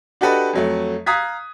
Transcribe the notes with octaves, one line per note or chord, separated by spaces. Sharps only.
D4 F#4 G4 A4 B4 D#5
F2 F#3 A3
F5 A#5 D#6 F#6 G#6 B6